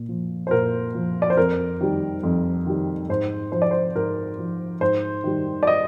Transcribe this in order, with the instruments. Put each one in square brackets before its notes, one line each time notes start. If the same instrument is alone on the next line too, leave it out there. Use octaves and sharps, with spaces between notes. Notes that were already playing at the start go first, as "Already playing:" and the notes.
Already playing: [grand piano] A#2
F3
C5
A#2 A#4
F3
D5
C5
F2 A#4
D#3 G3
F2
D#3 G3
G#2 C5
F3 C5
D5
C5
G#2 A#4
F3
G#2 C5
D#3 G3
D5
D#5